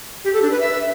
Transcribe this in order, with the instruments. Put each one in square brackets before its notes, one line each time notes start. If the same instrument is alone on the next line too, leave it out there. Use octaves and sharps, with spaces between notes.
[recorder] G4
A4
D4
B4
E5